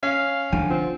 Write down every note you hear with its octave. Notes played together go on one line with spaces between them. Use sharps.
C#4 F5
D3 F3 G5 G#5
C4 F4